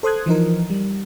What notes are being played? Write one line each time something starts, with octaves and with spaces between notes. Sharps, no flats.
A4 C5 C6 D#6 F#6 G#6
E3 F3 D#4 A#4
G3